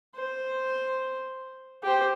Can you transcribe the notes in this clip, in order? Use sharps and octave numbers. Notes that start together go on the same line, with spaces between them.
C5
G4 C5